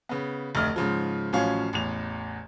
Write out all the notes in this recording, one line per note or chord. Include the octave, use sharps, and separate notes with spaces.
C#3 B3
F1 D2 D#5 F6
G#2 C#3 F3
A1 F3 F#3 C#4 F5
A1 E2 F7